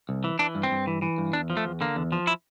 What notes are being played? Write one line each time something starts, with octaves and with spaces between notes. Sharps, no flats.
C2
E3
E3 D4
G2
C4
G2
E3
E3
G2
E2 D4
F3
A3
E2
D3 A#3
E2
F3
E4